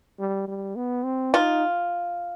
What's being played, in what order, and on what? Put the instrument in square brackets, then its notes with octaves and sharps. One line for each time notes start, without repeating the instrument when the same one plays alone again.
[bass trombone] G3
G3
B3
C4
[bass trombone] D#4 [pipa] F4